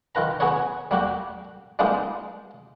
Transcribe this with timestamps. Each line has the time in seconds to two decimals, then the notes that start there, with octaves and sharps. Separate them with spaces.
0.15 D#3 F4 B4 A#5
0.40 B3 F#4 G#4 B4 C#5
0.91 G3 A#3 F#4 G4
1.79 G3 G#3 A#3 B3 D#4 F4